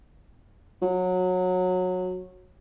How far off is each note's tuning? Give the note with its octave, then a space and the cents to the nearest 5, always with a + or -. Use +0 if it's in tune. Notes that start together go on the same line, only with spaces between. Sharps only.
F#3 -20